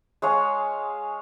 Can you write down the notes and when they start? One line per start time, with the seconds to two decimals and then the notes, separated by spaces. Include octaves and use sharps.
0.22 G#3 C#5 F5